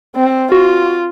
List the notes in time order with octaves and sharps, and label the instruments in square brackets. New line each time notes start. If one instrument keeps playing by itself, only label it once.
[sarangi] C4
[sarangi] F4 [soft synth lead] F#4